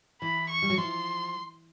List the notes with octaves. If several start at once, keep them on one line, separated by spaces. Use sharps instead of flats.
E3 B5
C#6
G3
F#3
F3 C6